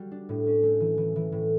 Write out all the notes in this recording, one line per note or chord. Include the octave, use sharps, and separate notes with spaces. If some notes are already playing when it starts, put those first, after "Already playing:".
Already playing: G3 F#4
D4
A2
C#4
A3
E3
E3
E3
A2